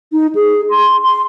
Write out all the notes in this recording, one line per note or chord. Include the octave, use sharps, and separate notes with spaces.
D#4
G#4
C6
C6